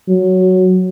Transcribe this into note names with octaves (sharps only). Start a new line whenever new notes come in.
F#3